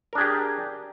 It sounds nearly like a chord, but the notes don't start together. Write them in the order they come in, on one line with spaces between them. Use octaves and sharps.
A#4 D4 G#4 G4